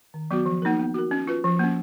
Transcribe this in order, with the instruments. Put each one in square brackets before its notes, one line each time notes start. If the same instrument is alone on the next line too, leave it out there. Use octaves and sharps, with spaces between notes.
[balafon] D#3
F#3 B3 F#4
F3
A#3 D#4 A#4
B3
F#4 A#4
C#4
F4 B4
F3
A#3 C#4